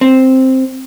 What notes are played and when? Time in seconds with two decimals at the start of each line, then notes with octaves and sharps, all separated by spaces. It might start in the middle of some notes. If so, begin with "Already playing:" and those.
0.01 C4